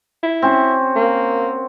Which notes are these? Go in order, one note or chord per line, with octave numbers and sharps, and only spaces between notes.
E4
C4 C#4 F#4
A#3